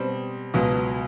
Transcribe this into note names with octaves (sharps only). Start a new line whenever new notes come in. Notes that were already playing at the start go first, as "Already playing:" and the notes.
Already playing: B2 G3 C4
C#2 B2 F#3